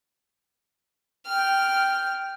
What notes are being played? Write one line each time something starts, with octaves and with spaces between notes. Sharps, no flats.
G5 F6